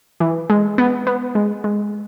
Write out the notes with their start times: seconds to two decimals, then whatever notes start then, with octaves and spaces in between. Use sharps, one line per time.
0.20 E3
0.50 G#3
0.78 B3
1.07 B3
1.35 G#3
1.64 G#3